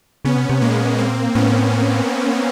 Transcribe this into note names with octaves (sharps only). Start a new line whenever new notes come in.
C#3 B3 C#4
C3
C3
A#2 G#3 A#3
A#3 C4
A2 B3 C#4